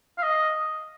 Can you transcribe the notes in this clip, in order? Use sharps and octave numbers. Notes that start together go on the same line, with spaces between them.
F5
D#5